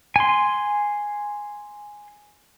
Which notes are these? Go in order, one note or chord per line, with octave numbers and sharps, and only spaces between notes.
G#5 C6